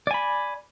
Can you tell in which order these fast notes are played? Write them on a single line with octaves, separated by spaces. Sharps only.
D5 G#5 B5